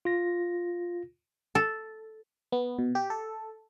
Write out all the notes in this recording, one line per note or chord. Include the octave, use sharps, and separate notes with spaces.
F4 A#6
A4
B3
B2
G4
A4